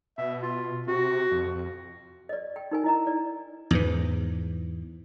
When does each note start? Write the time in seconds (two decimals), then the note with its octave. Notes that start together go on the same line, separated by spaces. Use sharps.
0.18 B2 E5
0.43 F4
0.87 C3 F#4
1.31 F2
1.55 F2
2.29 D5 D#5
2.56 G5
2.71 D#4 A#4 G#5
2.84 E4 D#5 A#5
3.07 D5
3.71 E2 G#2 E3